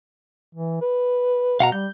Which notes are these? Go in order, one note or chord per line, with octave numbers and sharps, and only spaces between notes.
E3
B4
B2 F5 F#5 A#5
G3 G6